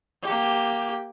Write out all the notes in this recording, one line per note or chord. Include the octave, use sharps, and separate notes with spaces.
A#3 G4